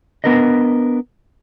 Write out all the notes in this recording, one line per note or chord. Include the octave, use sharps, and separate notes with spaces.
B3 D4 A#4 B4 D#5